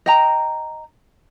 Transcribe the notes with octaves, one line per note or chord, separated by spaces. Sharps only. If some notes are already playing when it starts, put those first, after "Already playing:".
D#5 G5 A#5